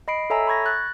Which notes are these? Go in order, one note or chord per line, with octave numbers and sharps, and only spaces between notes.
D#5 B5 C7 D7
A4 C#5 E5 G#5 A#5 E6
B5 C#6 G#6 A#6
F#6 A6